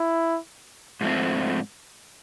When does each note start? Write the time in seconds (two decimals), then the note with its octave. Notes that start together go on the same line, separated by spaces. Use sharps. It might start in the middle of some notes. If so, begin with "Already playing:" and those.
Already playing: E4
1.01 G#2 F3 A3 C4